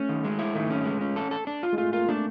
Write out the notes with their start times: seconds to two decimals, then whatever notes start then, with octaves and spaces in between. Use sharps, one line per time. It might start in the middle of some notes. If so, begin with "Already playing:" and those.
Already playing: A3 C#4
0.09 D#3
0.25 G#3
0.39 E4
0.55 D#3 A3
0.70 C#4
0.85 G#3
1.01 C#4
1.16 A4
1.31 A4
1.47 D4
1.63 F4
1.73 G#3
1.78 A3 F4
1.93 A#3 F4
2.04 A#3
2.09 A3 D4